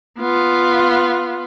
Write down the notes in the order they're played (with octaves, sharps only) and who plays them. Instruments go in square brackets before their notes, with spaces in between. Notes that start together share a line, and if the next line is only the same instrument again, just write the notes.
[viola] B3 F4